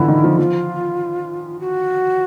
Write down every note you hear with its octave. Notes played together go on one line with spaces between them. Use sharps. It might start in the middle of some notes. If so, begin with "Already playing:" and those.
Already playing: D3 E3 F3 E4
D#3
F3
F3 F4
F#4